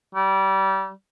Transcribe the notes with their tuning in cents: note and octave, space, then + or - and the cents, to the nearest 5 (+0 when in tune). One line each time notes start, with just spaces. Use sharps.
G3 -25